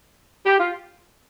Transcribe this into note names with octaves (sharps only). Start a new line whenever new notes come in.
G4
F4